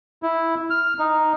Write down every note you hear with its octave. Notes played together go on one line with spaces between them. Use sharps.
E4
F6
D#4